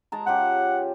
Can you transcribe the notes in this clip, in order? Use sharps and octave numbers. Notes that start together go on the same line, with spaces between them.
G#3 A5 A#5
C#3 F4 G4 F#5